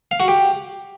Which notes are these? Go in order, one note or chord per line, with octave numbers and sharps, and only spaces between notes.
F5
F#4
G4